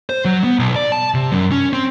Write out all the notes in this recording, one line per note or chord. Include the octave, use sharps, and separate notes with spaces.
C5
F#3
B3
B1
D5
A5
C3
F#2
C#4
C4